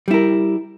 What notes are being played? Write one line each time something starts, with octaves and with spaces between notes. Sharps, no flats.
G3 E4 A#4